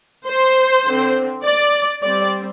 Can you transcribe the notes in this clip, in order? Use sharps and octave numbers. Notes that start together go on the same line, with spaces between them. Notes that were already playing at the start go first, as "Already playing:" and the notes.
C5
D3 C4
D5
G3 C4 D5